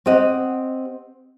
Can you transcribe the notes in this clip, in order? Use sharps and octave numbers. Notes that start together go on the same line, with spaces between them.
C4 G4 D#5 F#5